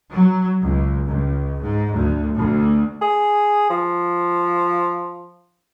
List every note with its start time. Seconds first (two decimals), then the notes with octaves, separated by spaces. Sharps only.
0.13 F#3
0.62 C#2
1.07 C#2
1.62 G#2
1.96 D2
2.38 D2
3.02 G#4
3.70 F3